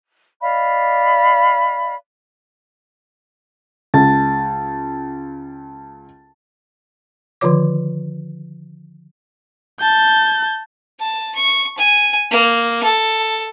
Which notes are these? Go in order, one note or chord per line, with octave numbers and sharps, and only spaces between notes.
D5 D#5 F5 B5
C#2 A5
D3 D#3 F3 F4 C#5 D6
A5 G6
A5
C#6
G#5
A#3
A4